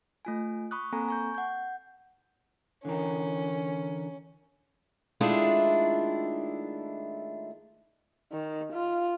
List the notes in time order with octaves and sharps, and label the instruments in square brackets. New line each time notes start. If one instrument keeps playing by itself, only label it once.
[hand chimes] A3 F4 G#5
B5 C#6 D#6 F#6
A#3 C4 A4 G#5 A#5
G#5 C#6 G6
F#5 G6
[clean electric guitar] D3 E3 A#4 [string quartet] C#4
[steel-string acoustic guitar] D#3 G#3 A3 D4 E4 F4
[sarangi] D#3
F4